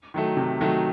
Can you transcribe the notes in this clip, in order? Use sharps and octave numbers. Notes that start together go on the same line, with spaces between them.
D#3 F#3 A3
C3
D#3 F#3 A3